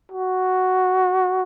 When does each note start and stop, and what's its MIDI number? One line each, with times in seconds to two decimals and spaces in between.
0.12 1.43 66